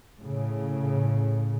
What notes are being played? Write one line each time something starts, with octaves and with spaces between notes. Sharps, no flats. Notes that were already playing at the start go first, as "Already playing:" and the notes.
A2 C#3